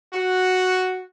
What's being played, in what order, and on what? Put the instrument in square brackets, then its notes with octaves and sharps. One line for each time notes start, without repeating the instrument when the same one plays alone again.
[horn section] F#4